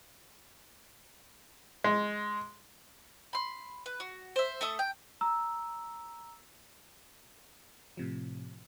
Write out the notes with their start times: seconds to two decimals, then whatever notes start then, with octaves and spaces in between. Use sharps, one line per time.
1.84 G#3
3.33 B5 C6
3.86 B4
4.00 F#4
4.36 C5 E5
4.61 A3 A4 E5 D#6
4.79 G5
5.21 A#5 E6
7.97 A2 C3 F3